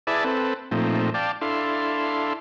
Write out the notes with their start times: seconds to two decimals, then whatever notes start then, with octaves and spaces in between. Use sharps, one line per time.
0.07 E4 G#4 B4 D5 E5 A5
0.24 C4 A4 B4
0.71 A#2 F3 A3 C4 D#4
1.14 D5 F5 G5 A5
1.41 D4 E4 A4 F5 C6